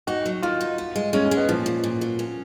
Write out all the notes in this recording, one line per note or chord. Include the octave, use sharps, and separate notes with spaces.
D#4 F#4
F#3
D#3 F4
D#4
B3
G#3
G#3 C#4
C#4
G#3
B3
A#2 F3
A#2
A#2
F#3
C#4